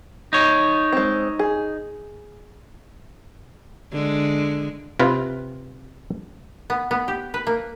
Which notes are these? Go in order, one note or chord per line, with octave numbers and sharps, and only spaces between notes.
D#4 C#5
G#3 C4
G#4
D3 G#3
C3 F4 B4
B3
B3
G4
B4
A#3